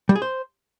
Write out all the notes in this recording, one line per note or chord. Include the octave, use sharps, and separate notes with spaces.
G3
G#4
C5